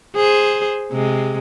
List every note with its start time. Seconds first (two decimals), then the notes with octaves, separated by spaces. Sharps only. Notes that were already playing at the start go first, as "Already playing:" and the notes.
0.15 G#4 C5
0.91 C3 G#3